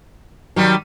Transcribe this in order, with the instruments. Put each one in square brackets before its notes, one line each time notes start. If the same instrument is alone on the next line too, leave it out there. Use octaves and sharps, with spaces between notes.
[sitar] D#3 G3 [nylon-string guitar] F#3